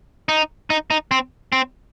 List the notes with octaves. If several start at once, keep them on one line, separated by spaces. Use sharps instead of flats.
D#4
D#4
D#4
C4
C4